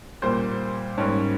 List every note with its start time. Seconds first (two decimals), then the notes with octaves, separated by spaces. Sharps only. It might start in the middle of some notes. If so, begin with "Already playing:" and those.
0.22 A#2 G3 A#3 C5
0.98 G#2 G3 A#3 C#4 C#5